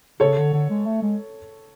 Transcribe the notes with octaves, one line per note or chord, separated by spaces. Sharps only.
C#3 A4 C#5
D3
D3
G#3
A3
G#3